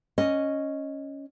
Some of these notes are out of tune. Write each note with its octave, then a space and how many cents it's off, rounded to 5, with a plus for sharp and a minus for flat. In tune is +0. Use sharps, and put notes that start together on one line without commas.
C#4 +0 D#5 +0